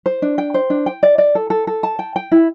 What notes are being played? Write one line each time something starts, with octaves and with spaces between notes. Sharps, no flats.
C5
D4
G5
C5
D4
G5
D5
D5
A4
A4
A4
A5
G5
G5
E4